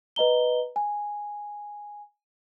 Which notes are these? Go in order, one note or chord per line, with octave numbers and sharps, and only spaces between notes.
B4 D#5 A#5 G7
G#5